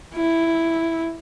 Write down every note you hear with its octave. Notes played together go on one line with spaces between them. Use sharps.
E4